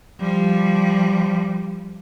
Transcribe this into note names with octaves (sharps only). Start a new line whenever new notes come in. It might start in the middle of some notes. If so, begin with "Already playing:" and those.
F3 G3